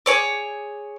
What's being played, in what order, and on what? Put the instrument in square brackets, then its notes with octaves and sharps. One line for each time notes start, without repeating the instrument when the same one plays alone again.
[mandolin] G#4 C#5 D6